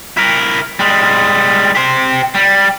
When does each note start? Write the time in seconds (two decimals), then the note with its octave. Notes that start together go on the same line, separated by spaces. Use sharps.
0.17 E4 A#4
0.79 G3 G#3
1.75 G4 C5
2.35 G3